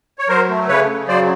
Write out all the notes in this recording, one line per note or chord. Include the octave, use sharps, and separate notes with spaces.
C#5
F#3 A#4 C5
A3
C#3 B4 C#5
C#3
F#3 C5 D5